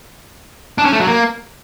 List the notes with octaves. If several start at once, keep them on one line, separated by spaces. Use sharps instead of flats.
D4
C#4
A3
F#3
A#3